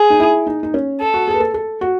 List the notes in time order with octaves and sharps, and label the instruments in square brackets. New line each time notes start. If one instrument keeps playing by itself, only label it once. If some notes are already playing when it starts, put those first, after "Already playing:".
Already playing: [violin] G#4
[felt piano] D#4
E4
D#4
D#4
C#4
[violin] A4
[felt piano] F#4
G#4
B4
A4
A4
F#4